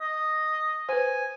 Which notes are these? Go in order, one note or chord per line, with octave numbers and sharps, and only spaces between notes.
D#5
B4 C5 G#5